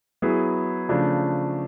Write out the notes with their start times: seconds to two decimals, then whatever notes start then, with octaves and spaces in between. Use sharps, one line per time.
0.22 F#3 B3 E4 G#4
0.89 C#3 F3 A3 D4